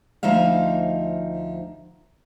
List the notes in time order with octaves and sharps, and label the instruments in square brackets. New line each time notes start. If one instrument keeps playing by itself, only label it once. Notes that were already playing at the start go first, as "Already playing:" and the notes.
[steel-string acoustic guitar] D2 F3 D#4 E5 F5